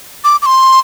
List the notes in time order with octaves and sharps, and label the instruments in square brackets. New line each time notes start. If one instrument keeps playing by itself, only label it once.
[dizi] D6
D6
C6